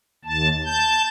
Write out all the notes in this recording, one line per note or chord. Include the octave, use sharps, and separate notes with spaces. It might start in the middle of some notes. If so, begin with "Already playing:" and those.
D#2 A5
A5 G6